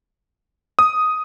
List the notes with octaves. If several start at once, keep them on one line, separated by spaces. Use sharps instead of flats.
D#6